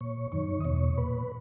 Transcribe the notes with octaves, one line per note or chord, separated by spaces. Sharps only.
A#2 C#5
F#2 D#3 C#5
D#5
E2 B2 C#5
A#2 B4